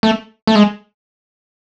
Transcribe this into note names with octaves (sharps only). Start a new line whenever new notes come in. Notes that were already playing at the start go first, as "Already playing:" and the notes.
A3
A3
G#3